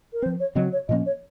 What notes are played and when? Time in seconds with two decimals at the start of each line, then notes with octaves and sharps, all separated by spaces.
0.13 A#4
0.22 C4 C5
0.26 F3
0.40 C#5
0.55 C#3 F#3 C4 D#5
0.72 C#5
0.88 A#2 F3 A#3 C#4 D#5
1.06 C#5